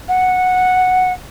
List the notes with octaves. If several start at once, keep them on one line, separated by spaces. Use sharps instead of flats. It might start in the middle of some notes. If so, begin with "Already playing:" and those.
F#5